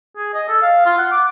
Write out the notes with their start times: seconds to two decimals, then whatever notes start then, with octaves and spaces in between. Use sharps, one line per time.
0.17 G#4
0.34 D#5
0.49 A4
0.62 F5
0.86 F4
0.98 F#5
1.11 D6